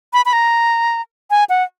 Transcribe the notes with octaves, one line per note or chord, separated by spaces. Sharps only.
B5
B5
A#5
G#5
F#5